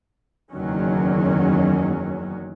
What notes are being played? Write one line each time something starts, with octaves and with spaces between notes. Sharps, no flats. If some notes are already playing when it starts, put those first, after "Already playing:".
F#1 E2 D#3 F#3 C#4